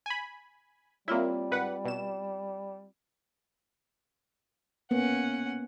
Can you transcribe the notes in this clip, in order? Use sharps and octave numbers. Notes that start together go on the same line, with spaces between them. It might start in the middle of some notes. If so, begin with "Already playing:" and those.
G#5 B5
G3 A#3 C4 E4 F4 C#5
G#1 B4 F#5
B2 E7
A#3 B3 C#4 F#5